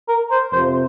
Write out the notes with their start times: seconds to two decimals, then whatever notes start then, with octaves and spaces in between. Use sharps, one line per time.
0.08 A#4
0.31 C5
0.52 F2 C3 F3 C5